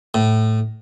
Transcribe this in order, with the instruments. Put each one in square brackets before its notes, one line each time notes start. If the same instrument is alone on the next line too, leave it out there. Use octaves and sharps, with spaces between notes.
[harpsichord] A2